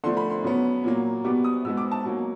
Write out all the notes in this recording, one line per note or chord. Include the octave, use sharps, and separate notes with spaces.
D3 F3 A3 C6
B5
C6
C#3 F#3 B3
A#2 F#3 A#3
B2 G3 B3 D6
D#6
B2 G#3 B3 E6
D6
A5
B2 F#3 A#3